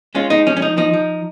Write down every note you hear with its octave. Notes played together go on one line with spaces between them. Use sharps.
G#3 C#4 F4
G#3 D#4
F3 C#4
C#4
F3 D#4
F3 D#4
F3